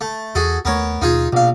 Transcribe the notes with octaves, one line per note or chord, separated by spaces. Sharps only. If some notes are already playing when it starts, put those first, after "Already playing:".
A3
E2 F#4 G#4 A4
D#2 A3 B3 A#4 C#5
D#2 B2 D#4 F4 G#4
A#1 B2 F5